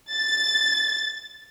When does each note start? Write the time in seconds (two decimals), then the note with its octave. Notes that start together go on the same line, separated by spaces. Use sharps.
0.12 A6